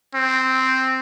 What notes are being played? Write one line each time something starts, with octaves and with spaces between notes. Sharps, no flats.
C4